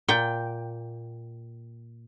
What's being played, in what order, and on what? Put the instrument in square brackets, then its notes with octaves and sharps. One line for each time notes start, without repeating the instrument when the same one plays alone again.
[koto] A#2 G5